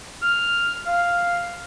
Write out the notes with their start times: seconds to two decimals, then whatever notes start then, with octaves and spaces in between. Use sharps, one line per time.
0.22 F6
0.86 F5